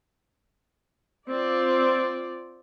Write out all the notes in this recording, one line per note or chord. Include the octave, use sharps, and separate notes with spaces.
C4 F4 D5